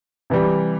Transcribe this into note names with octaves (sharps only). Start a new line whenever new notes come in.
C3 E3 G3